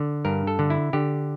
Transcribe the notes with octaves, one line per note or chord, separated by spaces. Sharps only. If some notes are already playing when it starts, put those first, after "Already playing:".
Already playing: D3
G2 A#4
A4
D3
E4
D3 G4